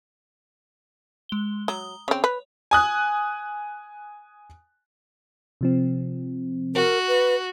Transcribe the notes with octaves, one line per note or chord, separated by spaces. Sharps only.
G#3 G7
F#3 A#5 D#6 G7
C#3 C4 C#5
B4
G#5 D#6 F#6
C3 F3 C4
F#4 A#4
B4